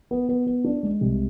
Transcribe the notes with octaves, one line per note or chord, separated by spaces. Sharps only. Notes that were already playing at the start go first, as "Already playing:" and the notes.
B3
B3
B3
D4
G#3
C2